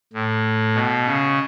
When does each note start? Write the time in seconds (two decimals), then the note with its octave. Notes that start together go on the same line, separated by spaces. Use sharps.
0.13 A2
0.75 B2
1.06 C#3